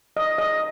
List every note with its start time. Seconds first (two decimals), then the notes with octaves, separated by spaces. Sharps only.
0.17 D#5
0.38 D#5